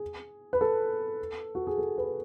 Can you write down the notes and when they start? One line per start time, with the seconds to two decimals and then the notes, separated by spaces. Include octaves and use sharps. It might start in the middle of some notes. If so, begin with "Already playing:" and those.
Already playing: G#4
0.53 B4
0.61 A4
1.55 F#4
1.67 G#4
1.78 A4
1.98 B4